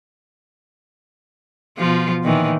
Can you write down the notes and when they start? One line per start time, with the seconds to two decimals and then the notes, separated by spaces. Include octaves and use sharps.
1.78 B2 F3 F4
2.23 A#2 D#3 E3